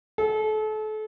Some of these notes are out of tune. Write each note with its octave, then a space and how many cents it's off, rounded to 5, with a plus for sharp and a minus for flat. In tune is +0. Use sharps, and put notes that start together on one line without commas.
A4 -35